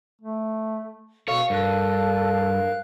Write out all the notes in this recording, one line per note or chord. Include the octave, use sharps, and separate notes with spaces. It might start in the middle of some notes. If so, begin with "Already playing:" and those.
A3
B2 A4 C#5 F5 C#6
G2 A4 A#4 F#6